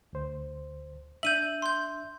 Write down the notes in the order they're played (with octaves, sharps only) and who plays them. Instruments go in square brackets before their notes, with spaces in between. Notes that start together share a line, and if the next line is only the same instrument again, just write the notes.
[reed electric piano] D2 C5
[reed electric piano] D4 E5 [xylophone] G6 D#7 F#7
[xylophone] C6 G6